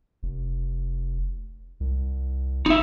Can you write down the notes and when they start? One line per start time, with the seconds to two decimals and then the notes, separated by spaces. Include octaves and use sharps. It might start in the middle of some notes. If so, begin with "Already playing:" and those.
0.23 F1
1.80 C2
2.66 F#1 D#4 E5